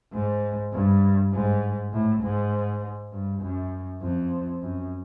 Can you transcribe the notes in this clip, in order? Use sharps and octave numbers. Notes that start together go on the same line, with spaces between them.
G#2
G2
G#2
A2
G#2
G2
F#2
F2
F#2